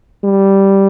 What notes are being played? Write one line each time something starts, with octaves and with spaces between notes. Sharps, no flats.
G3